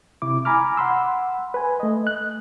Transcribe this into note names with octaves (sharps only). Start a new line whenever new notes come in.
C3 E4 D6
G#5 A#5 B5 D6 F6
F#5 B5 C6 E6
B4 G#5
A3 D#5
F#6